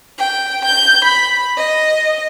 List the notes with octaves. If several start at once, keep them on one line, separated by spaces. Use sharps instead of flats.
G5
G6
B5
D#5